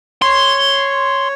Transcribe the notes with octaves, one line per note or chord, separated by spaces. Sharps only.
C#5 C6